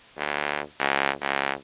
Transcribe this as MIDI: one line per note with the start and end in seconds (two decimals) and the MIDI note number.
0.17 0.61 38
0.80 1.11 37
1.21 1.52 37